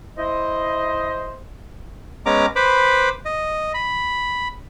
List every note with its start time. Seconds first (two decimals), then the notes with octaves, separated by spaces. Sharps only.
0.19 E4 C5 D#5
2.26 G#3 B3 C#4 A#5 D6
2.56 B4 C5 B5 D6
3.25 D#5
3.74 B5